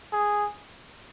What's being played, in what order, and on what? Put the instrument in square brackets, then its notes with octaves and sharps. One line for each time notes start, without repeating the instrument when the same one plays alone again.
[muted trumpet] G#4